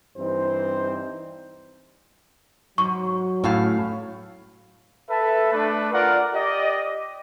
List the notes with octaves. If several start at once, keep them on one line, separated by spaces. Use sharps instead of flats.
G2 E3 C4 D#4 C5
G#2 F#3 C#6
A2 C#4 A4 F5
A4 B4 E5 A5
A3 D4 B4
F4 A#4 D5 F#5
G4 D5 D#5